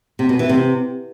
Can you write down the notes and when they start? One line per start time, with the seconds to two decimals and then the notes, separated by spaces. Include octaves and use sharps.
0.19 C3
0.29 B2
0.39 E3
0.49 C3